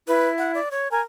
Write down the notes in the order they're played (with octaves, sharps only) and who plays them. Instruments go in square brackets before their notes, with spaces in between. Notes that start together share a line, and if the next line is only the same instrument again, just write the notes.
[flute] E4 [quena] B4
[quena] F#5
D5
C#5
[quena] A#4 [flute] G#5